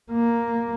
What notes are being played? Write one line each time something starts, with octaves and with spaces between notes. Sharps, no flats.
A#3